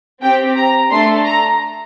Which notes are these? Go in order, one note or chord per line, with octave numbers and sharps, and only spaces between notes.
C4 G4 G5
A#5
A3 D4 A4 C6
A#5